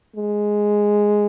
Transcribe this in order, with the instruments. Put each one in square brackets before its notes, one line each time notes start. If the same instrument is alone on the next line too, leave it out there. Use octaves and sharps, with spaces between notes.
[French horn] G#3